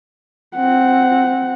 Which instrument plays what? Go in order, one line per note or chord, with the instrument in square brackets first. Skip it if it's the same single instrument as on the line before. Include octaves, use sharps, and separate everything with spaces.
[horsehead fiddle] C4 F#5